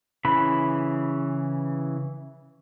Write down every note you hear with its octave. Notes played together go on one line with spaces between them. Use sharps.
C#3 E3 B5